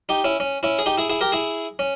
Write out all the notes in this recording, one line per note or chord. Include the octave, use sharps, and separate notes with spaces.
D#4 G4
C#4 E4
C#4
C#4 E4
G#4
D#4 G4
E4 G#4
E4 G#4
G4 A#4
E4 G#4
C#4